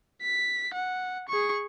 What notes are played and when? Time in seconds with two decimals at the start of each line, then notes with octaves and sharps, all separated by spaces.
0.22 B6
0.74 F#5
1.29 G#4 C#6